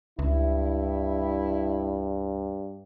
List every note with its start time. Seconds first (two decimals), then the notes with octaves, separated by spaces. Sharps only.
0.19 C#2 G2 E4